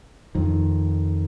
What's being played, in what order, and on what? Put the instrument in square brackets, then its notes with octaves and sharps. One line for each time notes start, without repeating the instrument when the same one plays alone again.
[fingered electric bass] F2 D#3